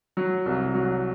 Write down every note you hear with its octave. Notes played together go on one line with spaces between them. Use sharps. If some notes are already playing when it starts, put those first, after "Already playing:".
F#3
C2
F#3